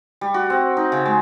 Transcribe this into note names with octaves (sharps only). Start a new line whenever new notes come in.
G3
F#4
C4
D#4
C#3
G#3